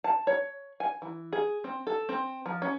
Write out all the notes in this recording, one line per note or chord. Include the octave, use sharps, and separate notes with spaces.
A5
C#5
G#5
E3
G#4
C4
A4
C4
F3
C#4